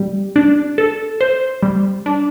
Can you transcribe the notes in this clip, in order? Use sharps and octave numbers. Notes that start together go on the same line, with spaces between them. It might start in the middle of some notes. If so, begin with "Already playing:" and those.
Already playing: G3
D4
A4
C5
G3
D4